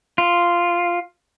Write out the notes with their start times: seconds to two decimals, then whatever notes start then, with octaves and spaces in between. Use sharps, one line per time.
0.18 F4